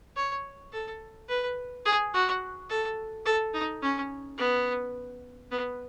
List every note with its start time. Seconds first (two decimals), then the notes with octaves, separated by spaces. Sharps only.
0.16 C#5
0.72 A4
1.28 B4
1.85 G#4
2.13 F#4
2.69 A4
3.26 A4
3.54 D#4
3.82 C#4
4.38 B3
5.51 B3